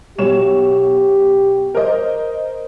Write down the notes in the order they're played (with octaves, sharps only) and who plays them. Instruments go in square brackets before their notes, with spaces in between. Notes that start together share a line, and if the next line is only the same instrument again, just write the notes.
[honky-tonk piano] B1 C#5 E7 [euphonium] G4
[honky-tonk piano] A#4 C5 D#5